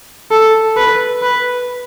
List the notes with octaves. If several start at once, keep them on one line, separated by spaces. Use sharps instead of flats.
A4
B4
B4